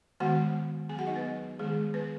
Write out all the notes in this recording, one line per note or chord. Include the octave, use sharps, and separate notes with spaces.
D#3 G#3 B3 F#4 F#5
F#3 B3 G#4 G#5
F#4 F#5
D#4 D#5
B3 B4
D#3 G#3 B3 G#4
B3 B4